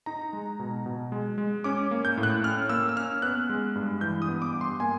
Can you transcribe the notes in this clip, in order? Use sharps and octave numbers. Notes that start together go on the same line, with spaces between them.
D#4 A#5
G#3
B2
B2
G#3
G#3
C#4 D6
A#3
G6
A2
F#6
C#4 F6
A#3 E6
E6
C#4 F6
B3 F#6
G#3
G2
E3 G6
D#6
B3
D6
G2
C6
A#3 G#5